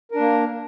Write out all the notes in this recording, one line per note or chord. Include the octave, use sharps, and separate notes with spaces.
A#3 D4 A#4